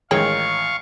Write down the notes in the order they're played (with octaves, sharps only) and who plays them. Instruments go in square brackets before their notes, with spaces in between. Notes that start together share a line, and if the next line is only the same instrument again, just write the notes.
[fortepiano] A1 D#3 G#3 [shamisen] G#4 C#5 G5 [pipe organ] F5 C#6